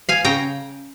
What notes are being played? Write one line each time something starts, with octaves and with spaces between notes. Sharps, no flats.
F5 G#5
C#3 G5 A#5